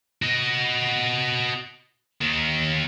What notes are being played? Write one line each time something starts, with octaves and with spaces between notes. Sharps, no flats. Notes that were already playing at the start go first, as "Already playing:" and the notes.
F#4 D#5
D#2 D#3